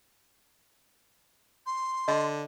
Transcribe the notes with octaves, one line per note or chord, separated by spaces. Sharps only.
C6
D3 D#5